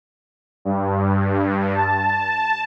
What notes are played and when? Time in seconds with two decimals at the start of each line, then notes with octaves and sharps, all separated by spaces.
0.65 G2
1.75 A5